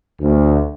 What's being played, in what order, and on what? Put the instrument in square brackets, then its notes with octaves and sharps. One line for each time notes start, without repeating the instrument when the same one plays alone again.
[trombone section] D2